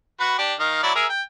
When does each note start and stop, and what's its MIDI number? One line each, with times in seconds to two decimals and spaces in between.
0.20 0.37 66
0.20 0.37 71
0.38 0.54 62
0.38 0.54 67
0.60 0.79 51
0.60 0.79 75
0.60 0.79 77
0.83 0.92 54
0.83 0.92 64
0.83 0.92 74
0.95 1.06 68
0.95 1.06 70
0.95 1.06 76
1.10 1.22 79